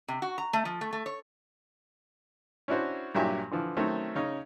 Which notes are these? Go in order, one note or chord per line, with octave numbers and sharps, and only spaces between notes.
C3
F#4
A#5
A3
F3
A3
A3
C#5
C#4 D4 E4 F#4 C5
G2 A#2 F#3 G4 E5 G#5
D3 E3 F3
D#3 F#3 A3 C4 C#4
C#3 C#4 D#4